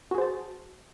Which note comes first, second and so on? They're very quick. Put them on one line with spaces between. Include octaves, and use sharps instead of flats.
F#4 G#4 C5 A5